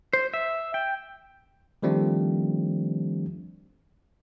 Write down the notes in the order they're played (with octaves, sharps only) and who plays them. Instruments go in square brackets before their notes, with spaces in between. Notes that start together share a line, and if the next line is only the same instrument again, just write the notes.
[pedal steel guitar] C5
E5
G5
[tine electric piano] D#3 F3 G3 A3 C4 D4